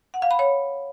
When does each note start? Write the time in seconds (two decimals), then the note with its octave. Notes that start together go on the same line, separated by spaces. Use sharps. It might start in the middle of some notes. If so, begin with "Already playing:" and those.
0.14 F#5
0.22 F5
0.31 B5
0.39 C#5